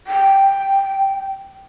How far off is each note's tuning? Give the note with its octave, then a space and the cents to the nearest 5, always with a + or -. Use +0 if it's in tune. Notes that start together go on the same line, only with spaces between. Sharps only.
G5 -5